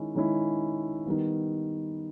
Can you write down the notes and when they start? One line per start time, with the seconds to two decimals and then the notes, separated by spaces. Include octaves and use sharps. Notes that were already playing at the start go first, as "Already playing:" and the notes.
Already playing: D#3 G#3 C#4 E4
0.15 D#3 G#3 C#4 E4
1.06 D#3 G3 B3